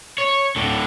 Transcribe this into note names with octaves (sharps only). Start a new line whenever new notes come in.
C#5
A2 D3